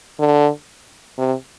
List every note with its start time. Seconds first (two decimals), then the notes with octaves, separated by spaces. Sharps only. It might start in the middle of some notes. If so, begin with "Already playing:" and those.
0.19 D3
1.18 C3